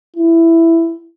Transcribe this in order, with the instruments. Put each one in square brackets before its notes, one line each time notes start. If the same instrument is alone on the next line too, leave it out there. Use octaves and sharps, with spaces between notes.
[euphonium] E4